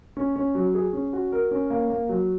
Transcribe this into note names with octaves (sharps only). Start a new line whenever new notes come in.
C#4
C#4
F#3
G#4
C#4
F#4
A#4
C#4
A#3
A#3
F#3